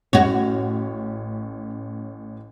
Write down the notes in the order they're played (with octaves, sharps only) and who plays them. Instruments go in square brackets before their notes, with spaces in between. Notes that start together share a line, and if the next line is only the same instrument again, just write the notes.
[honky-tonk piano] A1 C#4 [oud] F#4 C#5